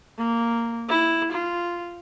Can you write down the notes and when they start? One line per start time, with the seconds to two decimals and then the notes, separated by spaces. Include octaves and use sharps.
0.18 A#3
0.89 E4
1.32 F4